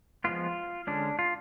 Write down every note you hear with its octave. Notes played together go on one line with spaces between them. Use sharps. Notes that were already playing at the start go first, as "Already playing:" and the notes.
F3 G#3 B3 F4
D3 G#3 C#4 D4
F4